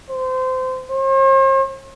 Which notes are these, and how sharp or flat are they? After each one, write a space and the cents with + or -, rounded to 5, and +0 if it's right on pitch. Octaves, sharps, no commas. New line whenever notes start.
C5 -25
C5 +45